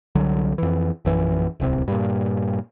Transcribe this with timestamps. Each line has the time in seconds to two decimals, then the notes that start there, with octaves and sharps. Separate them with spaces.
0.15 C2 D3 F#3
0.58 F2 E3
1.05 A#1 F#2 E3
1.60 D1 C2 C3
1.88 G2 A#2